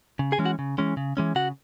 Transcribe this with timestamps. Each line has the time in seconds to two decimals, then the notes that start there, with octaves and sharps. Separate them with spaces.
0.19 C#3
0.32 G#4 G#5
0.39 E3 G#3 C#4
0.45 F#4 F#5
0.59 C#3
0.78 E3 G#3 C#4
0.97 C#3
1.17 E3 G#3 C#4
1.35 C#3 F#4 F#5